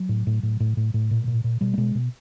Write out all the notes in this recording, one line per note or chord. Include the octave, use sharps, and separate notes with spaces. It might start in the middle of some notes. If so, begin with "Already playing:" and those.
Already playing: F#3
A2
A2
A2
A2
A2
A2
A#2
A#2
A#2
B2 G3
A3
B2 G#3
B2